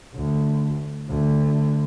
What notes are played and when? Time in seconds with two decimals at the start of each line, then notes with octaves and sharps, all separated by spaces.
0.14 D2
1.09 D2